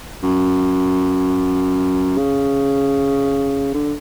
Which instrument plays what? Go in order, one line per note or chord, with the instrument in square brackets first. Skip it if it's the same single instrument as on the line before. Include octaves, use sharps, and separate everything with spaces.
[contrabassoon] F#2
C#3
D3